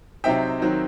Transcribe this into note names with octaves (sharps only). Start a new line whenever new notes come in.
C3 F#3 C4 D#4 E5 G5
D#3 F#3 C4 D#4